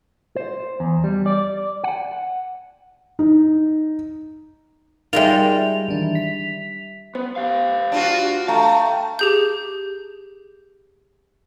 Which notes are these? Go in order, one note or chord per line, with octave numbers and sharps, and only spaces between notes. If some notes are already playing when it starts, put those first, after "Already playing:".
C5
E2
G3
D5
F#5
D#4
G3 G#3 D#4 F4 A#4 E5 F7
D#3 E3 D4
B6
B3 C5
G4 F5
D4 F4 F#4
A3 F5 G5 A5 A#5
G4 G#4 G6